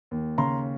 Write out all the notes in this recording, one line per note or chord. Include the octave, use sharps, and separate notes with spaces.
D#2
C#3 A#5 C6